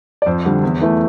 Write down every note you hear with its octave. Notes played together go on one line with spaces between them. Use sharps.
D5
F2 C5
D3 G3
E2
E3 A3